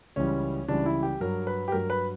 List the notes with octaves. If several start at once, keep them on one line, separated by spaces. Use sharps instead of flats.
C#2 C#3 E3 G3 C#4
C#2 C#3 E3 G3 D4
E4
G4
G2 F#3 A#4
B4
G4
G2 F#3 A#4
B4